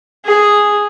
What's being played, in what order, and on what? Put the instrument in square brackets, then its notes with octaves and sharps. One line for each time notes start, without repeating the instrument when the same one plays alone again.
[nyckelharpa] G#4